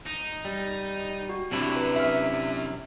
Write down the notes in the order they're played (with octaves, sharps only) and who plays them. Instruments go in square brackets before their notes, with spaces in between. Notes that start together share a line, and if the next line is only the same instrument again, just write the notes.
[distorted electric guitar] D#4
[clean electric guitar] G3
[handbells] F#4
[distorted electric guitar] F#2 [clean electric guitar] C3 D4 E4
[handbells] B4
E5 F6